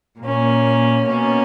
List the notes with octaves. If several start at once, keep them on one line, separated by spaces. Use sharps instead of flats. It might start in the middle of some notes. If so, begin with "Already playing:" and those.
A#2 A#3 C#4
B2 A#3 C#4